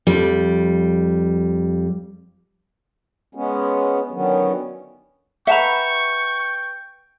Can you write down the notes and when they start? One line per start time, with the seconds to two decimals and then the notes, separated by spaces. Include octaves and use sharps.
0.07 F2 G3
3.35 G#3 B3 C#4
4.12 D3 D#3 F#3 B3 C#4
5.47 B4 E5 F#5 G5 A5 A#5 C#6